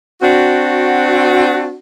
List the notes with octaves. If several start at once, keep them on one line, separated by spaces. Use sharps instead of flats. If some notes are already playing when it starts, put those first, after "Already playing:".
C4 D4 F#4